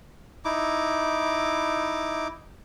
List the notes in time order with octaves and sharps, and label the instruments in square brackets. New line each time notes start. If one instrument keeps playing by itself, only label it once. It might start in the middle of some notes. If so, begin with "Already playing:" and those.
[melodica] D#4 E4 D6